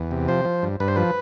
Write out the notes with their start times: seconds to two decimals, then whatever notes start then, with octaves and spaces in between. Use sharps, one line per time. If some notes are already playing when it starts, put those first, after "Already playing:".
Already playing: E2
0.11 C3
0.28 F3 C5
0.45 F3
0.62 G2
0.80 G2 B4
0.88 C5
0.96 F3 B4